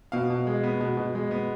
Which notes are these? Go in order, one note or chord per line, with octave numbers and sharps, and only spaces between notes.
B2 F5
B2
G#3
B3
B2
B2
G#3
B3